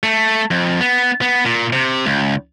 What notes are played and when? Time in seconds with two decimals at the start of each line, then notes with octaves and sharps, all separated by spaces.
0.03 A3
0.51 F2
0.80 B3
1.22 B3
1.45 A#2
1.73 C3
2.06 C#2